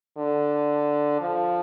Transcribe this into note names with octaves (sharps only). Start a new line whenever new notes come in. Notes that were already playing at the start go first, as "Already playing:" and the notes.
D3
F3